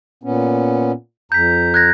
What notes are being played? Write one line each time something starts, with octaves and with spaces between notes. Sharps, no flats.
A#2 B3 C#4
F2 A#5 G6 B6
F#6 G#6 A#6